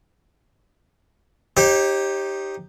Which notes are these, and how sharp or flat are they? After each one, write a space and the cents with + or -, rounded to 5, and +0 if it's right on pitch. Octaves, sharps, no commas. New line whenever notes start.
D#4 +0 G4 +0 C#5 -40